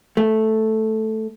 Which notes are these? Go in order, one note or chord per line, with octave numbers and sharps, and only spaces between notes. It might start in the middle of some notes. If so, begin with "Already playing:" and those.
A3